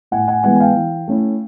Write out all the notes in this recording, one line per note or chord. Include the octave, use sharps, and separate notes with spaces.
A2 F#5 G#5
F#5 G#5
E3 G#3 B3 F#5 G#5
G#5
F5 G5
E3
A3 C#4 E4